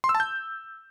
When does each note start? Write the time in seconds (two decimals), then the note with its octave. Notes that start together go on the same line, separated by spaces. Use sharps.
0.04 C6
0.09 E6
0.15 A5
0.20 G6